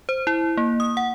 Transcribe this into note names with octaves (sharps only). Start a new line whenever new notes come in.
C5
E4
A#3
D#6
F#5